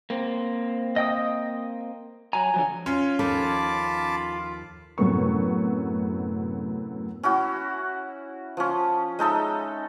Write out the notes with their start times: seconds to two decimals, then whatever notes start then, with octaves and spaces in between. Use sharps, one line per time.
0.10 A#3 C4
0.96 D#5 G5 D#6
2.33 F#3 G#5 A#5
2.54 D3 F3 F#3
2.86 C#4 F4
3.19 D#2 F3 A4 A5 B5 D6
4.98 F#2 A2 C3 B3 C#6
7.23 C#4 E4 F#4
8.57 F3 C#4
9.19 G#3 D#4 A4 E5